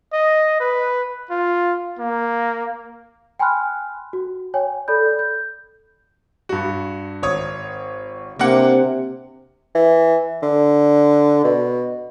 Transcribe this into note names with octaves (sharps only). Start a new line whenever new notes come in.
D#5
B4
F4
A#3
G5 G#5 B5 C6 F6 F#6
F#4
C#5 G5 G#5
A4 D5 B5 G6
G6
G2 F#4
G#1 C#5 D#6
C3 A#3 D4 F#5
E3
D3
B2